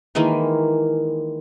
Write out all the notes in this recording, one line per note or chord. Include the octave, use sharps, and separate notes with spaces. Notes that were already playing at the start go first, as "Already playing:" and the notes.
D#3 E3 G#3 A#3